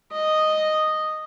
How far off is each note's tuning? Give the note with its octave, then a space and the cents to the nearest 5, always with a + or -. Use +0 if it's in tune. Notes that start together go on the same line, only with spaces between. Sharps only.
D#5 -5